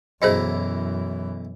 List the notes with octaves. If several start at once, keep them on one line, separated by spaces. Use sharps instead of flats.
B1 F#2 E3 E4 G#4 C5 D#5 A#5